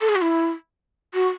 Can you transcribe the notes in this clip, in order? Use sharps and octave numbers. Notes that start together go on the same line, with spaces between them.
A4
G#4
F#4
E4
F#4